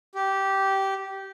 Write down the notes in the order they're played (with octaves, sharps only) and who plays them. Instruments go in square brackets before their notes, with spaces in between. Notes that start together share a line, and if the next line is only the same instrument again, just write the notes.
[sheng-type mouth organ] G4